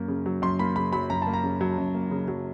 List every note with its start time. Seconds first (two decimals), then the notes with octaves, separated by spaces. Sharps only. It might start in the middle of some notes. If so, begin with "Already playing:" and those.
Already playing: F#2 A#3
0.08 C#3
0.26 F#3
0.42 F#2 C6
0.59 A#3 B5
0.76 C#3 B5
0.93 F#3 B5
1.10 F#2 A#5
1.22 A#3 A5
1.33 A#5
1.43 C#3
1.61 F#3
1.78 F#2
1.94 A#3
2.11 C#3
2.28 F#3